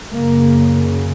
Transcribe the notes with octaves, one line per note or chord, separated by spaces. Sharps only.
F#2 C#3 A#3